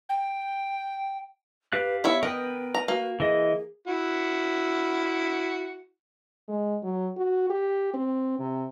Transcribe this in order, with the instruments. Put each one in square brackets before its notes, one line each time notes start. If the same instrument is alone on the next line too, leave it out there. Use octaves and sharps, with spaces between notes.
[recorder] G5
[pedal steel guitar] G4 F5 F#6 [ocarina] B4
[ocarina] B3 [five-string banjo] E4 C#5 E5
[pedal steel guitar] A#4 B4 G5 [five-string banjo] D#5
[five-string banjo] A#5
[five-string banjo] A#3 [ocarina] F#4
[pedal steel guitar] E3 D#5 [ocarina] G#4
[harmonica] E4 F#4
[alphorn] G#3
F#3
F#4
G4
C4
C3